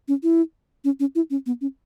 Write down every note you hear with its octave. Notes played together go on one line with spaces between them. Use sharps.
C#4
E4
C#4
C#4
E4
C#4
B3
C#4